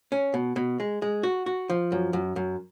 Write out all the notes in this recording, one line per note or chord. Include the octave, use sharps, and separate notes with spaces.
C#4
B2
B2
G#3
G#3
F#4
F#4
F3
F#2
F#2
F#2